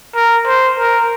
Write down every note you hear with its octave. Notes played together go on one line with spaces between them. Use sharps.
A#4
C5
A#4